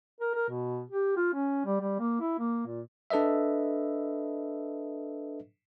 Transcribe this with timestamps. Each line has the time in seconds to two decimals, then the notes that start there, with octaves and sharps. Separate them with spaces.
0.21 A#4
0.34 A#4
0.49 B2
0.90 G4
1.17 F4
1.34 C#4
1.65 G3
1.80 G3
1.99 A#3
2.21 E4
2.39 A#3
2.66 A#2
3.10 D4 A4 B4 D#5 E5